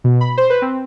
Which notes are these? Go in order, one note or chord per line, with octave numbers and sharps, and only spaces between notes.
B2
B5
C5
B4
C4